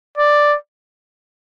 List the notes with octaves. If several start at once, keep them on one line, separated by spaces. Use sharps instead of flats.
D5